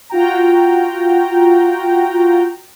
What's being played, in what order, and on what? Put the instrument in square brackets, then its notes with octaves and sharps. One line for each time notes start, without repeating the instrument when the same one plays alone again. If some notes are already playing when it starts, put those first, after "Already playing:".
[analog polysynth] F4 F#4 G5 A#5